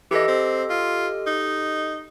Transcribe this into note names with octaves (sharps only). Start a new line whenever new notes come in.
E3 G4 A4 D#5
C4
F4
D#4